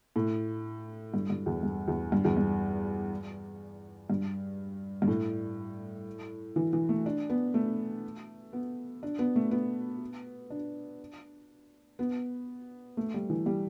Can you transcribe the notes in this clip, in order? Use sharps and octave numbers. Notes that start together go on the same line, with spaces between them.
A2
G2
G2
E2
G2
E2
G2
E2
G2
G2
G2
A2
E3
E3
A3
D4
B3
A3
B3
D4
B3
A3
B3
D4
B3
A3
G3
E3
G3